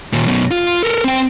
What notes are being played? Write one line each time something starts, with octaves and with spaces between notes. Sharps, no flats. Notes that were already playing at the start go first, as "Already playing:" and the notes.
D#2 A#2
F#2 B2
F4
A4 A#4
C4 G5